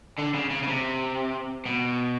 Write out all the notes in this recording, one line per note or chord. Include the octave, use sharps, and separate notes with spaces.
D3
C#3
C#3
C#3
C3
B2